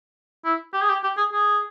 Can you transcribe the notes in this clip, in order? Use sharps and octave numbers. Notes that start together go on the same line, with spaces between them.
E4
G4
G#4
G4
G4
G#4
G#4